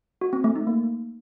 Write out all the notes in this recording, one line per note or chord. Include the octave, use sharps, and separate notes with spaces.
F#4
C4
A3
D#4
A#3